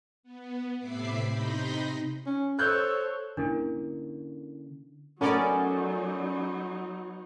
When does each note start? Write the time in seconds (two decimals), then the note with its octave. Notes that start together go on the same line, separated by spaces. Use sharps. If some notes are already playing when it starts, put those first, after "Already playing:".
0.23 B3
0.79 A2 C3 E5 B5 D6 C7
1.29 C3 D#4 B5 C6 G6 A#6
2.26 C#4
2.59 A4 C5 C#5 E6 F#6 G6
3.37 D3 A#3 C#4 D4 E4 A#4
5.21 F#3 A3 B3 C#4 D#4 A#4 D5 G#5